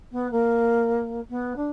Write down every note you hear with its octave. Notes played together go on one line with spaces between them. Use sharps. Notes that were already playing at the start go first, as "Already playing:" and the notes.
B3
A#3
B3
D4